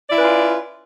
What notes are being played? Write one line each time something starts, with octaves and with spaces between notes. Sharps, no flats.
C#4 E4 F4 B4 D5